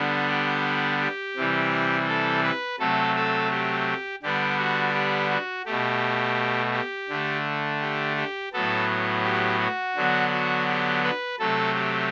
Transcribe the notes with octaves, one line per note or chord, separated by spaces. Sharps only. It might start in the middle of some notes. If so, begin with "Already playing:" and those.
Already playing: D3 G3 B3
G4
G4
C3 E3 G3
A4
B4
C3 F#3 A3 A4
A4
G4
D3 G3 B3 G4
F#4
G4
F#4
B2 A3 G4
G4
D3 A3
G4
G4
A2 F#3 B3 A4
G4
F#4
D3 F#3 B3
F#4
G4
B4
C3 F#3 A3 A4
G4